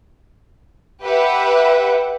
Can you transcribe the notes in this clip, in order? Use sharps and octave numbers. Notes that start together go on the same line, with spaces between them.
G4 B4 E5 F#5